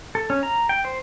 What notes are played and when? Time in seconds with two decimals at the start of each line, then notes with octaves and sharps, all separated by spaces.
0.15 A4
0.30 C#4
0.43 A#5
0.69 G5
0.85 C5